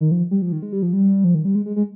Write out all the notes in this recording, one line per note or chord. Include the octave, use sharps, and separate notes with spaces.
D#3
F3
G3
F3
D#3
G#3
G3
F3
G3
F3
D#3
G3
G#3
G#3
G#3